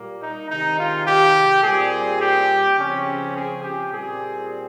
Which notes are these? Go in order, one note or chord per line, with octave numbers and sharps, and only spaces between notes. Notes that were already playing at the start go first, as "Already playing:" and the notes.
Already playing: A#2 G3 A#3
D#4
C3 D#3 G#3 D#4
F4
G4
A#2 G3 C4 G#4
G4
C#3 F3 C4 C#4
G#4
G4
A#2 G3 C4 G#4